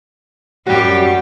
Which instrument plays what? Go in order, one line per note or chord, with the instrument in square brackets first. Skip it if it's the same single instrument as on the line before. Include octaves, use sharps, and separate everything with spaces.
[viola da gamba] F#2 G3 G4 [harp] F#4 G5